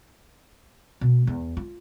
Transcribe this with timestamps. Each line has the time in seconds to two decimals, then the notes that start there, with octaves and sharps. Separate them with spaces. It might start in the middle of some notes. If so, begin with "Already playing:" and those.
1.01 B2
1.27 E2
1.57 F4